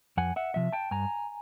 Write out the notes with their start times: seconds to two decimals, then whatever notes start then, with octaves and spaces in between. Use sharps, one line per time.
0.17 F2 F#5 G#5
0.36 E5 F#5
0.54 C3 F3 E5
0.73 G5 A5
0.91 G2 G#5 A#5